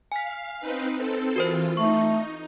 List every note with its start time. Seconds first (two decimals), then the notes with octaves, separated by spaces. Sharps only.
0.12 F5 G#5 B6
0.60 C4 D#4 B4
0.95 C4 A4
1.36 E3 F4 F#4 A#4 C5
1.77 A3 D#4 C#6